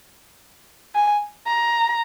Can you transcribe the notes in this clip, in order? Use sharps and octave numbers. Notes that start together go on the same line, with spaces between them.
G#5
A#5